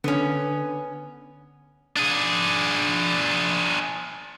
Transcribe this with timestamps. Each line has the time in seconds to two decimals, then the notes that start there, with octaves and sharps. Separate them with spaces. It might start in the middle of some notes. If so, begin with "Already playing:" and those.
0.04 D3 B3 C#4
1.96 D4 G#4